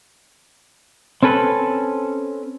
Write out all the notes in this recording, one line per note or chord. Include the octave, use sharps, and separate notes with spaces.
C4 C#4 A4 B4